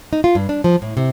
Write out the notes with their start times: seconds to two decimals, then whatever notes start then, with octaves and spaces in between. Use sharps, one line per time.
0.13 D#4
0.24 F4
0.35 G2
0.49 D4
0.64 F3
0.82 A2
0.97 C3